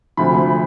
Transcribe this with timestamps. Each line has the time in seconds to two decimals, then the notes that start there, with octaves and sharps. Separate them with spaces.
0.17 D2 C3 F3 B5
0.35 B5